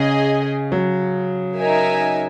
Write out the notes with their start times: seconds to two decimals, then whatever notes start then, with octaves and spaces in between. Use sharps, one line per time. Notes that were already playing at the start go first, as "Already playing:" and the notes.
Already playing: C#3 G#4 D#5 G#5
0.72 F#3
1.56 D#4 A#4 E5 G#5